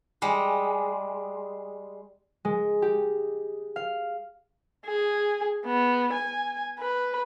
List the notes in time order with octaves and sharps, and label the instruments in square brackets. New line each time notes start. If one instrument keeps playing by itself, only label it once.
[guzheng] G3 G#3
[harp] G#3
G4
F5
[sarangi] G#4
B3
G#5
B4